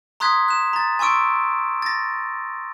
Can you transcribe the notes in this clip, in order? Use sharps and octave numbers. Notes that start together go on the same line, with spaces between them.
A#5 C6 D#6 F#6 G#6 B6
F#6 E7
A#5 A6
G#5 C6 C#6 E6 D7
A6 A#6